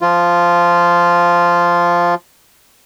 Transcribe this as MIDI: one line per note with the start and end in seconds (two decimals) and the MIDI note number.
0.01 2.15 53
0.01 2.15 65